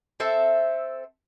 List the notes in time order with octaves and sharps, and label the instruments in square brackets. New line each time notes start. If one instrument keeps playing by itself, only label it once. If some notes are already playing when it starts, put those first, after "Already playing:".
[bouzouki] C4 A4 E5